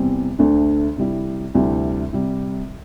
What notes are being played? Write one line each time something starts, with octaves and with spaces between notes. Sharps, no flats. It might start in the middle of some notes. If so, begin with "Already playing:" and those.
Already playing: E2 C3 G3 C4
D2 D3 A3 D4
C3 G3 E4
D2 C3 G3 E4
C3 G3